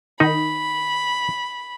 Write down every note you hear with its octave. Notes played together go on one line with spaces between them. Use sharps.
D#3 D#4 B5